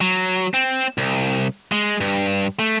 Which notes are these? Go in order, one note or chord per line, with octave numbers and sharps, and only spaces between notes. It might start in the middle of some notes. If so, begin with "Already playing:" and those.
F#3
C4
C2
G#3
G2
A3